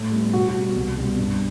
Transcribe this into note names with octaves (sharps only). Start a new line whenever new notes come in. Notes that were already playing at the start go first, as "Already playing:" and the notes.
Already playing: A2 A3 A4
G3 B3
B2 F#4
F#4
G3 B3
C2
B2 G3 B3
G2